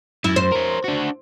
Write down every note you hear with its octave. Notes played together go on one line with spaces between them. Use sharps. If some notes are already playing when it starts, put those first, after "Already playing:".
F#2 E4
C5
A#4 C#5
D4 F#4